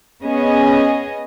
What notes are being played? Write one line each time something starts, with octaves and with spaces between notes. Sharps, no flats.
B3 C#4 G#4 D#5